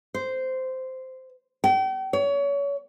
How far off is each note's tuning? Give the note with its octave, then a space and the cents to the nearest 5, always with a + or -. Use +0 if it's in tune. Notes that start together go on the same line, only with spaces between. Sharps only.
C5 -10
G5 -40
C#5 +30